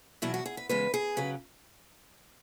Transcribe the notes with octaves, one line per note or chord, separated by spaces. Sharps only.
E2 B2 F#3 E4
F#4
G#4
B4
E2 C#3 G#3 B4
G#4
C#3 F#3 B4